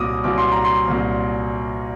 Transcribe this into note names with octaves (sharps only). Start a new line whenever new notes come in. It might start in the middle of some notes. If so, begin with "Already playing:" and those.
Already playing: C2 A#2 F#3 D6 D#6
C2 A#2 F#3 D6
C6
A#5
C6
C2 A#2 F#3